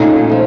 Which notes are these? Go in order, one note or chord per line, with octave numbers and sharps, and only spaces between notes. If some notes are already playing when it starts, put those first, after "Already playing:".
Already playing: A#2 A3 C#4 D#4
C#3 F3